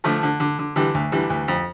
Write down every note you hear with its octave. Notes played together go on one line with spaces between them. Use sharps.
D3 F3 A3
D3
D3
D3
D3 E3 G3
D2
D3 E3 G3
D2
F2